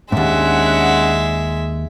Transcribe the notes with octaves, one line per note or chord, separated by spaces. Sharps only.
D#2 G#2 G#3 C#4 D4 E5 F#5